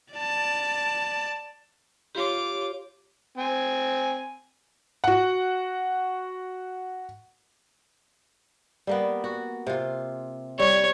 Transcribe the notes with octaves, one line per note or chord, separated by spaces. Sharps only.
D5 A5
F4 G4 C#5 D6
C4 G#5
F#4 F#5
G3 A#3 B3
F#4
C3 F4
G3 C#5